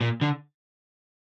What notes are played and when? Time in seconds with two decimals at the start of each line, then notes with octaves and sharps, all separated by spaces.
0.01 A#2
0.21 D3